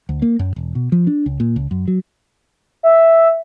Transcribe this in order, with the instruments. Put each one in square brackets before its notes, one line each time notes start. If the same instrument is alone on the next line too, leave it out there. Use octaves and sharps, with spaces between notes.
[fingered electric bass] D2
A#3
F#2
E1
B2
F3
D4
C#2
A#2
C#2
F#2
F#3
[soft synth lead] E5